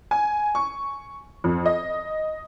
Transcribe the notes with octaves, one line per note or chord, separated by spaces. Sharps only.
G#5
C#6
F2
D#5